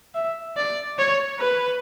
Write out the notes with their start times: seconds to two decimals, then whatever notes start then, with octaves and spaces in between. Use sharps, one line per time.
0.15 E5
0.57 D5
0.98 C#5
1.40 B4